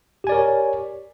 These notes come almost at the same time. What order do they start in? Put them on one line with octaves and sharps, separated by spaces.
G4 G#5 D5 A#4 C#5